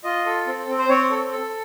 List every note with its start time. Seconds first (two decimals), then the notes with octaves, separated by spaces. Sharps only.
0.04 F4 D#5
0.26 A4
0.47 C4
0.68 C4
0.78 C5
0.89 C4 C#5
1.10 A4
1.31 A4